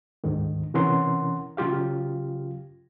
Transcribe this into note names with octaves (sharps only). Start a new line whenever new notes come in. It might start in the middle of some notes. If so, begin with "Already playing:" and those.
D2 G#2 D3 D#3
C3 E3 C#4 A#4 F#5 C6
C#3 F#3 F4 G4 F5